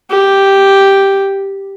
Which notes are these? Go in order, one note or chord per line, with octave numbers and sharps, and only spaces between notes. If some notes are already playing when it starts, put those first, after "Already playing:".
G4